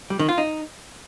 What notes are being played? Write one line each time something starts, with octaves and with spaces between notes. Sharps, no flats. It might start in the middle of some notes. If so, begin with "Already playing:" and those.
G3
D#3
F4
D#4